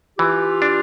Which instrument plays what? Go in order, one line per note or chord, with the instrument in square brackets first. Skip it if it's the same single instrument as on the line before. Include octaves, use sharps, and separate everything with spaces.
[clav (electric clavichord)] E3 [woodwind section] F4 G4
[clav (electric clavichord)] D4